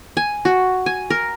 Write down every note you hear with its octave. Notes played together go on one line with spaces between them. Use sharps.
G#5
F#4
G#5
A#4